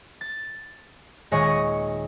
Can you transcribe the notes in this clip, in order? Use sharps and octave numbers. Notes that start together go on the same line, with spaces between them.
A6
D#1 G#3 G#4 C#5 D#5 C#6